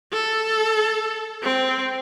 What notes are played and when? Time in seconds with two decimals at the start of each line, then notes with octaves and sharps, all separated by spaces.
0.12 A4
1.43 C4